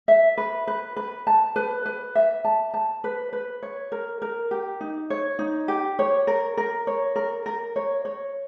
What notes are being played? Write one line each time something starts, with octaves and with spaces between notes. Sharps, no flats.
E5
B4
B4
B4
A5
B4
B4
E5
A5
A5
B4
B4
C#5
A#4
A#4
G4
D#4
C#5
D#4
G4
C#5
A#4
A#4
C#5
A#4
A#4
C#5
C#5